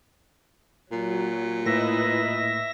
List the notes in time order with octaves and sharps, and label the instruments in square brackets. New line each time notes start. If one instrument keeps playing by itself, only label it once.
[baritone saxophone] A#2 [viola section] F#3
[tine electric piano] A2 A#3 [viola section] E4 B4 D#5 [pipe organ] E5 A#6